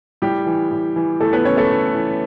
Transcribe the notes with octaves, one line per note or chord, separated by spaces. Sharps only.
A2 G3 G4
E3
A2
E3
A2 A3 A4
B3 B4
E3 C#4 C#5
A3 A4
A2
E3